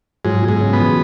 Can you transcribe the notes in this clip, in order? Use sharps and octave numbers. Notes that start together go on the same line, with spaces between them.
G#2 F#3
B2
G#2
C#3
B3
E3